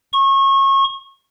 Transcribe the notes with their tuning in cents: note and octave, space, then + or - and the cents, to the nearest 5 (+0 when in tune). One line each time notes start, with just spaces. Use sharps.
C#6 -30